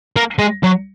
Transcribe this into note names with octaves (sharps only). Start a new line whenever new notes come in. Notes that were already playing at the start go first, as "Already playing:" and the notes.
A#3
G#3
F#3